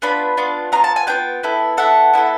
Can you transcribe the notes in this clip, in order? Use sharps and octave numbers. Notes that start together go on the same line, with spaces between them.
B3 D4 F4 B5
B3 D4 F4
B3 D4 F4 A#5
A5
G#5
B3 D4 F4 G5
B3 E4 A4
B3 E4 A4 F#5
B3 E4 A4